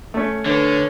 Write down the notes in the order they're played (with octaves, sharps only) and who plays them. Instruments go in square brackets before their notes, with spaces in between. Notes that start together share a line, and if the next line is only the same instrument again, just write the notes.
[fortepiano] A3 C#4
[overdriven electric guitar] D3 [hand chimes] D4 B4 [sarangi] C#5